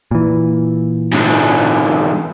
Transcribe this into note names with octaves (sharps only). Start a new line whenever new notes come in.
A#2 E3
G#2 D3